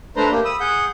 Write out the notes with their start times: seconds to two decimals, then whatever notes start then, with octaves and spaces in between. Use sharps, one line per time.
0.17 A3 D4 B4 C5 A#5 C6
0.31 A#3 G4
0.45 B5 D#6 E6
0.60 G#4 F#5 G6